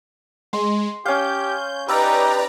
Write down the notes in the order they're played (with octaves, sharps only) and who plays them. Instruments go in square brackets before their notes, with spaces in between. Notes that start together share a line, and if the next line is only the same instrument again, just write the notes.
[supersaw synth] G#3 [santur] C6
[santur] C#4 F5 [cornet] G4 [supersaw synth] G6
[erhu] D#4 [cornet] G4 [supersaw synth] B4 D5 A#5 [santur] E6